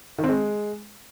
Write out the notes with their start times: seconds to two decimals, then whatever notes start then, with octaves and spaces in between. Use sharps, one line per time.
0.19 D#3
0.24 C4
0.29 G#3